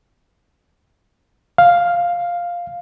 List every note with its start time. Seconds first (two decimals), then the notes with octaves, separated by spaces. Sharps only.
1.58 F5